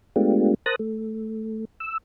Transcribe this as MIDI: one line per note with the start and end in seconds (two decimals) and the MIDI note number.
0.16 0.54 56
0.16 0.54 57
0.16 0.54 59
0.16 0.54 62
0.16 0.54 65
0.16 0.54 67
0.66 0.76 70
0.66 0.76 72
0.66 0.76 81
0.66 0.76 87
0.66 0.76 90
0.66 0.76 94
0.79 1.65 57
1.80 1.98 88